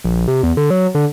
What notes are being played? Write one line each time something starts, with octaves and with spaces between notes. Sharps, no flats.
A#1
C3
E2
D3
F#3
D3